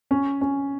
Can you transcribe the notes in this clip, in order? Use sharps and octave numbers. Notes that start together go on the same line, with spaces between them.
C#4
C#4